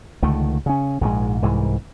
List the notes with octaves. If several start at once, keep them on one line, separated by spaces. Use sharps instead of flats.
C#2 D3 D#3 A3
C#3 C#4
A#1 G#2 F3 G#3
C2 G#2 E3